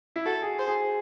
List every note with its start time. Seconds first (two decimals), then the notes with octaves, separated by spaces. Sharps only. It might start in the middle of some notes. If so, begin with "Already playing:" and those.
0.16 E4
0.25 F#4 A4
0.42 G#4
0.59 C5
0.67 G#4